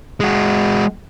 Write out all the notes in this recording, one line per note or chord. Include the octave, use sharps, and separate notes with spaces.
G#3 F#4